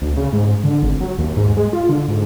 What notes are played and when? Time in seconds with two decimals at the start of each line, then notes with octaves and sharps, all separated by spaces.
0.02 D2
0.17 C#3
0.33 G#2
0.64 D3
0.83 G#1
1.00 F#3
1.19 D#2
1.37 G#2
1.57 G#3
1.73 F4
1.89 D3
2.08 G#2